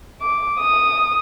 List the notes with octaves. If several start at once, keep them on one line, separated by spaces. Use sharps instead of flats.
D6
D#6